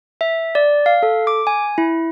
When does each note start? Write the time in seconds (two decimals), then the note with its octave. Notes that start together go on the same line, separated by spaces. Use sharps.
0.21 E5
0.55 D5
0.86 F5
1.03 A4
1.27 D6
1.47 G#5
1.78 E4